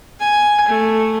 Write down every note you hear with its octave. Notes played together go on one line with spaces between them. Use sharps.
G#5
A3